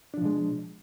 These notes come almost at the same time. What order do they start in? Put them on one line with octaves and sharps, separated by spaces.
D4 F3 B2 G#3